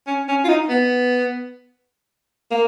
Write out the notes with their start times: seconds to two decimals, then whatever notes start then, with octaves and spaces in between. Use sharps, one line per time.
0.07 C#4
0.28 C#4
0.44 F4
0.49 D#4
0.69 B3
2.51 A#3